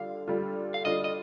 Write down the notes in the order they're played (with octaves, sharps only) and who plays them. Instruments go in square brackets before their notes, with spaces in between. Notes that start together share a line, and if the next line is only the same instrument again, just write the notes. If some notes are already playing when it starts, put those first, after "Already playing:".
Already playing: [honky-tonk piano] D3 G3 D4 F4 [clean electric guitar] F5
[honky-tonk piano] D3 G3 D4 F4
[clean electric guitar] F5
[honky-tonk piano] D3 G3 D4 F4 [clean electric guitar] D#5
[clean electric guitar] D#5